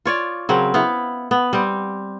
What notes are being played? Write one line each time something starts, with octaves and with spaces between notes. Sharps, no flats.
F4 C#5 D5
C#3 F#3 C4 A#4
B3 E4 F5
B3
G3 C4